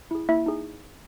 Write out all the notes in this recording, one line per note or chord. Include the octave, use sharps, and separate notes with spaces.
E4 G#4
A#3 E4 E5
D#4 G#4